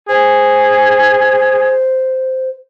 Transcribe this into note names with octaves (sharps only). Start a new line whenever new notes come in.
G#4 C5